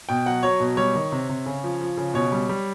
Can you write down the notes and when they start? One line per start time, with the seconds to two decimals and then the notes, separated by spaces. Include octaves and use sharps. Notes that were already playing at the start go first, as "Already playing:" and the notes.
0.09 B2 G5
0.26 F#3 F#5
0.43 F#3 C#5
0.60 B2
0.77 G3 C#5
0.95 D#3
1.12 C3
1.29 C3
1.46 C#3
1.64 F3
1.81 F3
1.97 C#3
2.14 B2 C#5
2.32 G3
2.49 G3